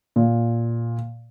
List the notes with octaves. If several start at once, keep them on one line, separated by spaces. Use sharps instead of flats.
A#2